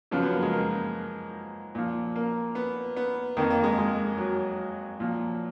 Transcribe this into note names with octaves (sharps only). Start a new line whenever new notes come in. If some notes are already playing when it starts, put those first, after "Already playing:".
F#2 C#3 F3 B3
B3
A#3
G#3
A#3
A#2 F3
A#3
B3
B3
F2 D#3 A#3
A#3
G#3
G#3
F#3
A#2 F3